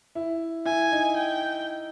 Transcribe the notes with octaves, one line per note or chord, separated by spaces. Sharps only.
E4
E4 G#5
D#4
G5